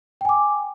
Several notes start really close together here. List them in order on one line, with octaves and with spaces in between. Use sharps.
G5 G#5 D6